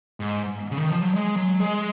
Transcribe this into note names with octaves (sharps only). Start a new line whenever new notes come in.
G#2
C#3
D#3
F3
F#3
G#3
F#3
G#3